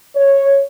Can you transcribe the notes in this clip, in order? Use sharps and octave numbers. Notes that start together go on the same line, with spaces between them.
C#5